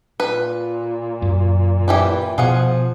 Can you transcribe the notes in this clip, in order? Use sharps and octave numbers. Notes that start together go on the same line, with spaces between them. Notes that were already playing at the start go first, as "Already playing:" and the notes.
A#2 B4
F#2
E3 G4 B4
B2 F3 F4 G#4 F#5